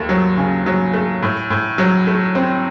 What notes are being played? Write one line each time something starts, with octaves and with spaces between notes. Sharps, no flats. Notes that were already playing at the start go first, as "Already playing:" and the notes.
Already playing: D#2 A3
F#3
C#3
F#3
A3
A2
A2
F#3
A3
C4